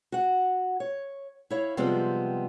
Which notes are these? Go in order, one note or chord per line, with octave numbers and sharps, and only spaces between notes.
F#4 F#5
C#5
E4 C#5 F5
C3 F3 G3 G#3 B3 C4